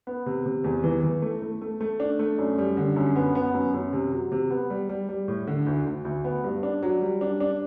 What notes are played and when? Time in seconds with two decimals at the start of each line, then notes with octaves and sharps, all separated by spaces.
0.07 B3
0.26 C3
0.46 C3
0.64 E2
0.84 E3
1.03 E3
1.22 A3
1.42 A3
1.62 A3
1.81 A3
2.00 D4
2.19 A3
2.38 F#2
2.58 G3
2.77 D3
2.96 F#2
3.16 B3
3.35 B3
3.54 F#2
3.74 F#2
3.93 C3
4.12 F#3
4.32 C3
4.50 B3
4.70 G3
4.89 G3
5.09 G3
5.28 A2
5.47 D3
5.67 D2
5.86 D2
6.05 D2
6.24 B3
6.44 G2
6.63 D4
6.83 F#3
7.02 G3
7.21 D4
7.40 D4